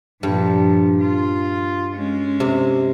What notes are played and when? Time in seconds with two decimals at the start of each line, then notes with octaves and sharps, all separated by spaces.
0.23 G2 A#2 F3
1.00 F4
1.95 G#3 C#4
2.40 C3